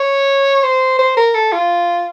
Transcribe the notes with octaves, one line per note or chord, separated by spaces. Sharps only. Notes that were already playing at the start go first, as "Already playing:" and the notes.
Already playing: C#5
C5
C5
A#4
A4
F4